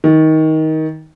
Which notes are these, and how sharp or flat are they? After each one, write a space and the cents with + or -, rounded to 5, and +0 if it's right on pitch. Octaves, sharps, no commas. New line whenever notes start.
D#3 +20